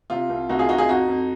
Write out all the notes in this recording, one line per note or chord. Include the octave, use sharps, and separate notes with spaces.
C3 F4
C2
C2 D#4 F#4
F4 G#4
C2 D#4 F#4
F4 G#4
F2 D#4 F#4
F2